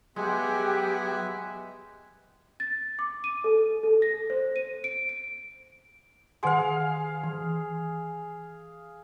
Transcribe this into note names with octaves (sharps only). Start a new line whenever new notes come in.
F#3 G#3 B3 G4 E5 G#5
A6
D6
D#7
A4
A4
A#6
C5
D#7
D7
D7
D#3 G#4 F5 F#5 C6
E3